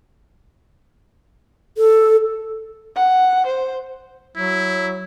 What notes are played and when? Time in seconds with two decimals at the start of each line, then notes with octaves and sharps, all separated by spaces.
1.78 A4
2.96 F#5
3.46 C5
4.36 F#3 E4